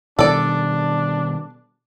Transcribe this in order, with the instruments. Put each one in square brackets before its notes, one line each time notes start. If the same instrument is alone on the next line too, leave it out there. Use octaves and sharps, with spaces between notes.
[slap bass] B2 D#3 G3 [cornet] D4 [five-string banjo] A4 D5